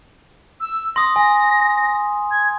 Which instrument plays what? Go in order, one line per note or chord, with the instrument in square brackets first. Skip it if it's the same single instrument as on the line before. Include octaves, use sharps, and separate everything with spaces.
[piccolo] E6
[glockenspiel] C6 D#6 [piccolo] A#6
[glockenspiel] G#5
[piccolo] G#6